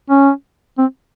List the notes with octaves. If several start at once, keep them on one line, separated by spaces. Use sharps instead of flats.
C#4
C4